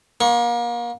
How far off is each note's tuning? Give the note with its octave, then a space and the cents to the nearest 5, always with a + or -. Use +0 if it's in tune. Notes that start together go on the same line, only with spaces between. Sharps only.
A#3 +35 C#6 -15